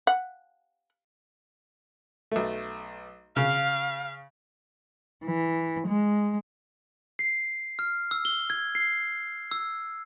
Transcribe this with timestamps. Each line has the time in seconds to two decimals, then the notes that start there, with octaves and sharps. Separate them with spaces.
0.07 F#5
2.31 B1 A3
3.36 C#3 F5
5.24 E3
5.88 G#3
7.19 C7
7.79 F6
8.11 E6
8.25 G7
8.50 G#6
8.75 C7
9.52 E6